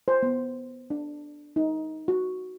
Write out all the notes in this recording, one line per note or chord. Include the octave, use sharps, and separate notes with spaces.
C5
B3
D4
D#4
F#4